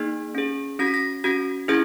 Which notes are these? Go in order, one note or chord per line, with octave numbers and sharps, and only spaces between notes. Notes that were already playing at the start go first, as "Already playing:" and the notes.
Already playing: A#3 D#4 G#4
C#4 G#4
C#4 F#4 A#6
B6
A#6
C#4 F#4 A#6
C#4 E4 G#4 G#6